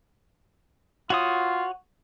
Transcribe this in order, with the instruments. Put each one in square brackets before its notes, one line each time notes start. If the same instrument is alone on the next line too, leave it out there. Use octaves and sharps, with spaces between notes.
[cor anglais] F4 [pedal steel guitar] F#4 C#5 D#6